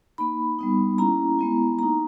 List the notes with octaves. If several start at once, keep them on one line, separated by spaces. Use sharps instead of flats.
A#3 D#4 B5
G3 B3 D#4
A#3 C#4 E4 A#5
G#3 B3 E4
A#3 D#4 A#5